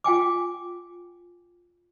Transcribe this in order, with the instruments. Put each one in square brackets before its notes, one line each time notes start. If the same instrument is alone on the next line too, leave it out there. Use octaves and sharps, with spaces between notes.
[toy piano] F4 G5 G#5 D6